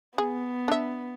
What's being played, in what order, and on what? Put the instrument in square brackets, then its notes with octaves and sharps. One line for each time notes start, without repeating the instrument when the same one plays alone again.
[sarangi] B3 [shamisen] G#4
[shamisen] D4 E5